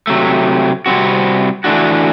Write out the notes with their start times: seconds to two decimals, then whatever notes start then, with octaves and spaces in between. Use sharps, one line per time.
0.07 C3 F#3 A3
0.86 C3 G3 C4 F#4
1.64 E3 A3 D4 F#4